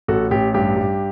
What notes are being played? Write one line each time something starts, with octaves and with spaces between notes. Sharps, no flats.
A1 F#4 A4
A1 G4
G2 G4
G2